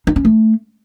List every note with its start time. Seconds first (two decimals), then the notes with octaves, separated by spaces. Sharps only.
0.07 D#4
0.16 C#4
0.25 A3